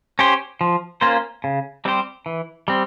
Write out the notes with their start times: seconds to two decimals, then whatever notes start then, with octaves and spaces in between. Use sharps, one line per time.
0.19 C#4 G4 C5
0.61 F3
1.01 A#3 C#4 F4 C5
1.44 C#3
1.85 G3 C4 G4 C5
2.26 E3
2.68 G3 C4